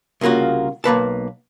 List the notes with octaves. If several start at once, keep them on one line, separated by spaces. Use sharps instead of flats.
C2 C#3 A#3 F4 F#4
B1 A#3 B4 A5